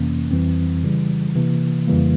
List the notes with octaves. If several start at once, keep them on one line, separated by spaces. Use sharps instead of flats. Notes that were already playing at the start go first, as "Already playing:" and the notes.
Already playing: F2 C3 E3 A#3 C#4
F2 E3 G3 C4
C#3 E3 G3
C3 E3 A#3
F2 C#3 E3 G3 A#3